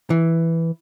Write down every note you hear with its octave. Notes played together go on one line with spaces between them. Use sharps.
E3